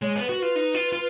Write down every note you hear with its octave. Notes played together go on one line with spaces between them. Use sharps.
G#3 C#5
B3 B4
F#4
F4 B4
D#4
F4
F4